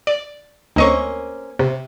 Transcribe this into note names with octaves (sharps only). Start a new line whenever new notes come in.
D5
D2 A#3 C4 C#4 D#5 C#6
C3